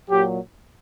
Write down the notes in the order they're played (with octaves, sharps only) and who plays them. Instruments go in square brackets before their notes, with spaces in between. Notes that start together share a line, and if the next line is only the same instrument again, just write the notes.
[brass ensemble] A#2 F#3 G4